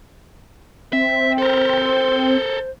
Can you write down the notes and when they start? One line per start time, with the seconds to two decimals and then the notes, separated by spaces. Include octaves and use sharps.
0.93 C4 E5
1.38 A4 A#4 C5